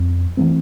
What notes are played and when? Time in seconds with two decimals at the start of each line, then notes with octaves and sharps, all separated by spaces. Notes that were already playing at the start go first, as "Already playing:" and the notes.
Already playing: F2
0.37 E3 A3 C4